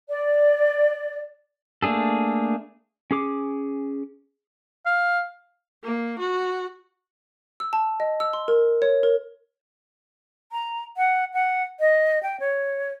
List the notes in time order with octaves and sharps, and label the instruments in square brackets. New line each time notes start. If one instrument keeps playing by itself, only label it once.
[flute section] D5
[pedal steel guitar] A3 A#3 D4 G#4 A4
C#4 G#4 D6
[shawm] F5
[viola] A#3
F#4
[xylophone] E6
A5
D#5
E6
C6
A#4
C#5
A#4
[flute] A#5
F#5
F#5
D#5
G5
C#5